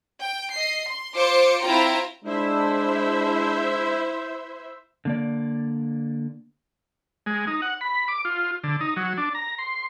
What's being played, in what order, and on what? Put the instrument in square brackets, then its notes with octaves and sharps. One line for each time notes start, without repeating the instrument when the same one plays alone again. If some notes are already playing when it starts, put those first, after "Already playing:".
[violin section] G5
D#5 C7
C6
F4 C5 C6 D6 C#7
C4 E4 F4 G5 A#5
[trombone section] G#3 D4 [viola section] E4 C5 E5
[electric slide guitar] D3 A#3 D5
[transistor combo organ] G#3
D#4
F#5
B5
D6
F4
D3
D#4
F#3
D4
A#5
C6